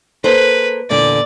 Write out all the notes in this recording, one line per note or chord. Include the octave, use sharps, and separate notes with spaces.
A#3 A4 B4 C5
E2 A#2 D3 D5